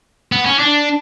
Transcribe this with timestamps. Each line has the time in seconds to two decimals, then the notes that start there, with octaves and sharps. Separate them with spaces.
0.32 B3
0.46 C#4
0.59 D4